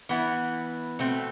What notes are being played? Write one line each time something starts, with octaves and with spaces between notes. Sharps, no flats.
E3 B3 E4
B2 A3 C4